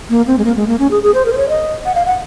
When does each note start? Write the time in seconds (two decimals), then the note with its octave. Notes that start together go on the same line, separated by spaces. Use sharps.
0.10 A#3
0.27 C4
0.38 G#3
0.45 A#3
0.56 G#3
0.68 A#3
0.79 C#4
0.91 G#4
1.03 G#4
1.14 C5
1.25 A#4
1.33 C5
1.37 C#5
1.49 D#5
1.86 F#5
1.95 F5
2.07 F#5